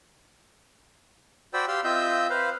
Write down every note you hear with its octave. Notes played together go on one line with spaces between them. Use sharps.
F#4 C5 D5 G5 B5 E6
G4 F5 C6 E6
C4 F4 D#5 E5 E6 G6
B4 C5 F5